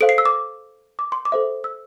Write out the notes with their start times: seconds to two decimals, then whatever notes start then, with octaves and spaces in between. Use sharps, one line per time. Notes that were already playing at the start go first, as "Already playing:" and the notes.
0.01 A4 C5 F5 D7
0.09 C7
0.18 E6
0.25 D6
0.99 D6
1.12 C6
1.25 D6
1.32 A4 C5 E5
1.64 E6